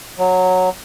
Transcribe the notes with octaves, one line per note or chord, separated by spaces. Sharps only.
F#3